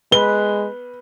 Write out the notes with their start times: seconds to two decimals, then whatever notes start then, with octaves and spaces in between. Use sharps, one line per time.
0.12 G#3 B4 G7